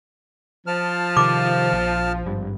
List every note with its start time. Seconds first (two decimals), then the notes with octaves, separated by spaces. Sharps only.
0.67 F3 A5 F6
1.17 C3 D#3 D6
1.73 A#1
2.26 G#1 G2